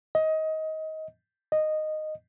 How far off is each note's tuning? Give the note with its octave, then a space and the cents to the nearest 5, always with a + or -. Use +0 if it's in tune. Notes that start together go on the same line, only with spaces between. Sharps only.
D#5 +20
D#5 -10